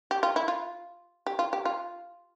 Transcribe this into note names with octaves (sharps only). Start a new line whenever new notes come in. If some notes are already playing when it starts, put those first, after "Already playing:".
G4
F4
E4
F4
G4
F4
G4
F4